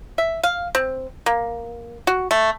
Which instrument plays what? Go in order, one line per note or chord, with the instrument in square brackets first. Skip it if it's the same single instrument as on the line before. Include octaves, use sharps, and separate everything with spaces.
[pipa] E5
F5
C4
A#3
F#4
A3